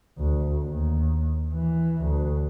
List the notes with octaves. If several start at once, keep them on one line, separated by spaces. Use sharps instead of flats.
D2
D#2
E3
D2